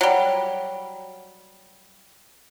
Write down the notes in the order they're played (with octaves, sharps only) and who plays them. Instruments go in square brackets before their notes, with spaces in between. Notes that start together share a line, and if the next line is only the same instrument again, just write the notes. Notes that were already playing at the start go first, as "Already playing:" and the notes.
[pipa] F#3 G3